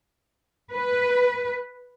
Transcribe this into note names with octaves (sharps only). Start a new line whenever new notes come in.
B4